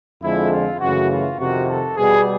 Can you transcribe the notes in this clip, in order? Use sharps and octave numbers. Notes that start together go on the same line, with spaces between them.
F2 D3 F3 G#3 E4
F4
F#2 C#3 E3 A3 F#4
F4
F2 C3 D#3 F#4
A4
B2 G3 B3 G#4